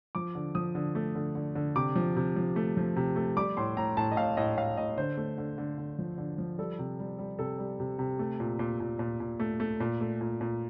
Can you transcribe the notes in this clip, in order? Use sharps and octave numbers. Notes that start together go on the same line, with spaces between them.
F3 D6
D3
F3 D#6
D3
A3
D3
D3
D3
C3 D6
F3
C3
F3
A3
F3
C3
A3
G3 D6
A2 C6
A2 A#5
A2 A5
D#5
A2 F5
A2 D#5
A2 F5
A2 D#5
D3 C5
A3
D3
D3
D3
F3
D3
F3
G3 A4
C3
G3
G3
C3 A4
G3
C3
C3
A3
A#2
A#2
A#2
A#2
A#2
A3
A3
A#2
A3
A#2
A#2